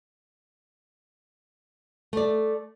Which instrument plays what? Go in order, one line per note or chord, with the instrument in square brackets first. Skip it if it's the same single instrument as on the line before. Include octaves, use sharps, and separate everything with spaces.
[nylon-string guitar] A3 D5